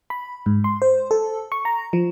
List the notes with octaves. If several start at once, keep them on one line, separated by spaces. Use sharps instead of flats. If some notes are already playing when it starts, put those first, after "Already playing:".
B5
G#2
C6
C5
A4
C#6
A#5
F3